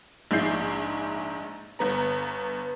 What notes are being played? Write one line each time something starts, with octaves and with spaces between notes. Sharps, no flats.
A#1 G#2 D#4 E4 G6 C7
G1 B3 A#5